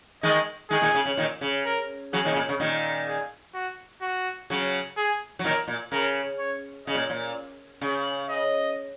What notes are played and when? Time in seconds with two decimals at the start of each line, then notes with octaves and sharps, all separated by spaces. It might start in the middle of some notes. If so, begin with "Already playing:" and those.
0.23 D#3 G#3 D#5
0.70 D#3 G#3 G#4
0.82 A#2 D#3
0.94 C#3
1.05 C#3
1.17 A#2 D#3
1.41 C#3
1.66 A#4
2.13 C#3 F#3 G#4
2.25 A#2 D#3
2.32 C#3
2.36 A#2
2.49 C#3
2.60 A#2 D#3
3.08 G#4
3.54 F#4
4.02 F#4
4.50 C#3 F#3
4.97 G#4
5.39 F#3
5.44 A#2 D#3 A#4
5.68 A#2
5.92 C#3 A#4
6.39 C#5
6.87 C#3 D#5
6.95 A#2
7.10 A#2
7.81 C#3
8.29 D#5